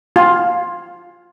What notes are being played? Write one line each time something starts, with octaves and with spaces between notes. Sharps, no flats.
F4